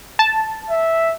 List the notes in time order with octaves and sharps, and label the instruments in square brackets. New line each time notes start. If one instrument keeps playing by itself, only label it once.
[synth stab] A5
[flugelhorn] E5